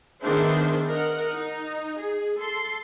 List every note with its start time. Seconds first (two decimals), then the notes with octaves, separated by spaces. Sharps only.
0.21 D#3 B3 D4 G#4 C5 E5
0.88 A#4 D#5 F#5
1.31 D#4
1.98 G#4
2.36 A4 C6